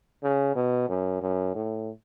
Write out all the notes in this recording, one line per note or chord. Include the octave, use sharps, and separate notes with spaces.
C#3
B2
F#2
F#2
A2